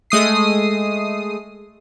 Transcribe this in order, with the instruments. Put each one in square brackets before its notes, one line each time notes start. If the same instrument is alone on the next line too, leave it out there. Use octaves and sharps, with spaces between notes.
[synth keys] G#3 A3 D#6 C7